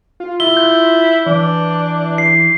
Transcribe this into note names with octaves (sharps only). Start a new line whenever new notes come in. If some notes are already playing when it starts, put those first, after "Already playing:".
F4
E4 G7
G6
E3 D4
C7